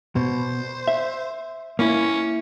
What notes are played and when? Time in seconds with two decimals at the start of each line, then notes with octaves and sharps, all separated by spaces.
0.16 B2 C5
0.88 E5
1.79 A#3 C#4 E4